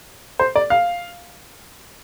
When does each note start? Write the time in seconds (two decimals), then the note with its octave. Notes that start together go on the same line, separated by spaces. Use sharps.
0.39 C5
0.56 D5
0.70 F5